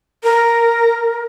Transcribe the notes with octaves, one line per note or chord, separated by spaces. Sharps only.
A#4